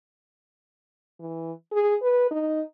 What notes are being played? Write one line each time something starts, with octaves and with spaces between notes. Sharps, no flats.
E3
G#4
B4
D#4